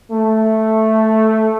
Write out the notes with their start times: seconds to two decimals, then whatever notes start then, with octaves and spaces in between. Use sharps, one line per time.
0.10 A3